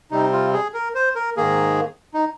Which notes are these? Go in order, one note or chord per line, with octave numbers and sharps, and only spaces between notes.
C3 G3 C4 D#4
F4
G#4
A#4
C5
A#4
G#2 D#3 A#3 G#4
D#4